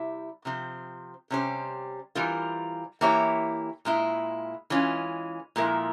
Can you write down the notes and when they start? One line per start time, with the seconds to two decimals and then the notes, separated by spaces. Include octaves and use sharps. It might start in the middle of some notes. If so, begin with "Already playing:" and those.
Already playing: C3 G3 E4
0.45 C3 F3 C4
1.30 C3 G3 C#4 G4 C5
2.15 E3 G3 C4 F4 A#4
3.01 E3 A#3 E4 G4 C#5
3.85 A#2 G#3 E4
4.70 E3 G#3 C#4 F4
5.56 A#2 F3 G#3 E4 A#4